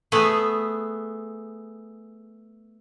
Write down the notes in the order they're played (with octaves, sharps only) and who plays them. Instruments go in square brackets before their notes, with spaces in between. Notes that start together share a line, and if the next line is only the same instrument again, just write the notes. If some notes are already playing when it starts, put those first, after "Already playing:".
[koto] A3 B3 G#4